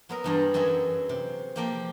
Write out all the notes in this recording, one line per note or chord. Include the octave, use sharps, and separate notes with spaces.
F#3 B3 A#4
E2 G2 G3
F#2 F#3 G#4 E5 G#5
C3
F3 A#3 G4